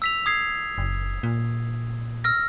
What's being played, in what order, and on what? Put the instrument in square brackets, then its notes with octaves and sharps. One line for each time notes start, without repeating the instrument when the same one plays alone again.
[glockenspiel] E6 B6 F7
D#6 G#6 C7
[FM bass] F#1
A#2
[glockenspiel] E6 F6 A#6